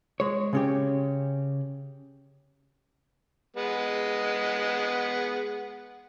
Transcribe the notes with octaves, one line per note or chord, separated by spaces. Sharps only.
G#3 C#5
C#3 C#4 G4
G#3 B3